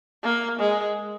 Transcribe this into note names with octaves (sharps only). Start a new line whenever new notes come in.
A#3
G#3